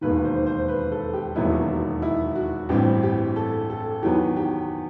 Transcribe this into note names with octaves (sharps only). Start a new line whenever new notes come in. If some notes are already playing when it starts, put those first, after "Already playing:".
E1 D#2 D#3 B4
C5
C5
B4
A4
G4
E1 D#2 D#3 F#3 B3 E4
E4
F#4
A1 G2 E3 G3 C4 G4
G4
A4
A4
E2 D#3 F#3 B3 G4
G4